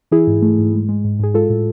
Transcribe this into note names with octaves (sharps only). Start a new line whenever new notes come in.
E3 E4 G#4
G#2
A3
G#2
G#3
G#3
G#2
G#2 G#4
G#3 F4 A4
A2